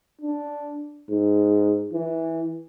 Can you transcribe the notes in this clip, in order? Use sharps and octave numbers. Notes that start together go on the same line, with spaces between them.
D4
G#2
E3